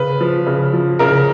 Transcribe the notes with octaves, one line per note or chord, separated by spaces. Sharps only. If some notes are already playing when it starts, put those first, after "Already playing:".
Already playing: C#3 B4
F3
C#3
F3
C#3 A#4